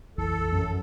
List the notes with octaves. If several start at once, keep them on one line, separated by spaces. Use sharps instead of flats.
A#1 F2 E3 A4
F#2